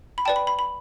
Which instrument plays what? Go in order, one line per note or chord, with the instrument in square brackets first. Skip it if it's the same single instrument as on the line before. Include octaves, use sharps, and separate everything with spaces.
[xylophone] B5
B4 D5 G5 A5
B5
B5
B5